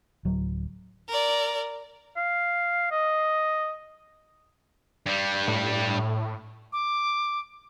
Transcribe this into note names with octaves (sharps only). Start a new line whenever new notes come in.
D1 F#3
A#4 D5
F5
D#5
G2 G3
A2
D6